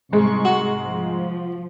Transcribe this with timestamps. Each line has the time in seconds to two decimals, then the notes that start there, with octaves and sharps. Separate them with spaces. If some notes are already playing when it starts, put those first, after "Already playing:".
0.13 C2 G#2 G#3 C#6
0.45 F#4
0.83 F3